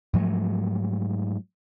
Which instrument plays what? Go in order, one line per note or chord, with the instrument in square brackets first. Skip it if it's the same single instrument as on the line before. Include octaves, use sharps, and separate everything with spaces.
[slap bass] G#2 F3 F#3 A3